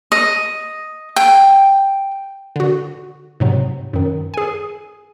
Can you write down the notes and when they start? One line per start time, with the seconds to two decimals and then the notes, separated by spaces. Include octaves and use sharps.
0.12 D#5
1.16 G5
2.56 D3 F#4
3.40 G#2 C3 F#3
3.93 F#2 D#3
4.34 G#4 G#5